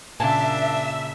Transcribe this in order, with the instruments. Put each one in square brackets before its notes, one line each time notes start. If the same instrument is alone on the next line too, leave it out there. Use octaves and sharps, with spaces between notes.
[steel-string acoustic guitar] A#2 C#3 [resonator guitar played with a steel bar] A#3 G#5 A5 [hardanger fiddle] D4 [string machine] E5